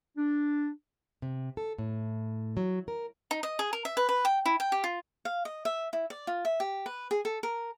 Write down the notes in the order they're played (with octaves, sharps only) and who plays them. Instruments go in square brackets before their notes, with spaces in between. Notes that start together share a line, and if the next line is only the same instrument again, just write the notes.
[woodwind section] D4
[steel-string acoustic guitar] C3
A4
A2
F#3
A#4
[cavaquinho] D#4
D#5
G#4
A#4
E5
B4
B4
G5
E4
G5
G4
F4
F5
D#5
E5
E4
D5
F4
E5
G4
B4
G#4
A4
A#4